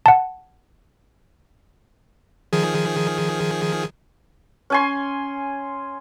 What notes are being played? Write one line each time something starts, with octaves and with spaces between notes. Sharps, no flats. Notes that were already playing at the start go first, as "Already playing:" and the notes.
F#5 A5
D#3 F3 G#4
C#4 G#5 C6